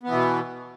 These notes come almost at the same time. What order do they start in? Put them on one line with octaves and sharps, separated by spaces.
B3 E3 B2